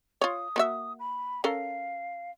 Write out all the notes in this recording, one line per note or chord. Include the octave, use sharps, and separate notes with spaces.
F4 C#5 D#6
A#3 F#4 E5
B5
C#4 A4 A#4 F5